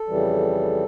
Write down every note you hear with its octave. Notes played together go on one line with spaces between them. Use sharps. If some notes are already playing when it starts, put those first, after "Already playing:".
Already playing: A4
F2 C#3 E3 G3